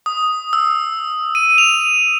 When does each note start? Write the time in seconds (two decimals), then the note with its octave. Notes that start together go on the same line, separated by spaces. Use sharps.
0.06 D#6
0.53 E6
1.35 D#7
1.58 F7